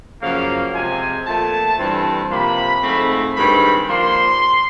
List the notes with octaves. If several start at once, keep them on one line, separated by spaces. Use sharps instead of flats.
F#2 C#3 F3 A#3 F5
C3 F3 G#3 C4 G#5
A#2 F3 A3 A5
G2 E3 G3 C4
C3 F3 A#3 B5
G#2 F3 A3 C4
G2 D#3 G#3 C4 B5
A#2 F3 A#3 C6